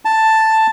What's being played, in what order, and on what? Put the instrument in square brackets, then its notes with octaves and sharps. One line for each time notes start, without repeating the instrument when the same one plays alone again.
[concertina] A5